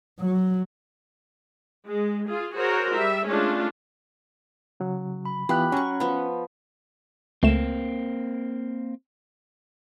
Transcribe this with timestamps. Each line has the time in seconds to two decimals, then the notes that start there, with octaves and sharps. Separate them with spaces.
0.20 F#3
1.86 G#3
2.26 F4 G#4
2.55 F#4 G#4 A#4 C5 C#5
2.95 G3 E5
3.27 G#3 A3 C#4 D4 F4
4.80 C#3 F#3
5.25 B5
5.49 E3 B3 F4 G4 B5 F#6
5.72 F#3 C#4 C#6
6.00 F3 B3
7.43 C#2 A3 A#3 C4 E7